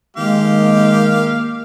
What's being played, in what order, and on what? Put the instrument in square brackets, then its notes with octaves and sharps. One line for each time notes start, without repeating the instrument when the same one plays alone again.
[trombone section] D#3 A#3 [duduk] G#3 [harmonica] G4 F5